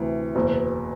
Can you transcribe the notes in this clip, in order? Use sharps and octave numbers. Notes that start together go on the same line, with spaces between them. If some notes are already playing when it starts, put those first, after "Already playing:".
Already playing: D2 C3 E3
F#1 E2 B2